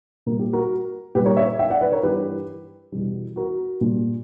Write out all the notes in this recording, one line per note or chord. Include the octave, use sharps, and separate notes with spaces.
A#2 G3 A#4
G4
F#4 A#4
A#2 G3 G4 B4
A#4 C#5
C#5 E5
E5 G5
D5 F#5
B4 D5
A#4 C#5
G2 E3 G3 G4 B4
E2 B2 G3
F#4 A#4
A#2 G3